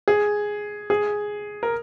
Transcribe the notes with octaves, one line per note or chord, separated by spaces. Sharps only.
G#4
G#4
A#4